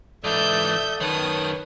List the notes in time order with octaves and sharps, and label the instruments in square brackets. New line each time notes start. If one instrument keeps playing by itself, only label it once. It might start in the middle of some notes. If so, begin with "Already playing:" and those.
[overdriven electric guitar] G#2 E3 [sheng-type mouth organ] A4 D5 D#6 [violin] E5 G6
[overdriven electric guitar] F#2 D#3 [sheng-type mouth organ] B4 C#5 G5 [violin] A5 D#6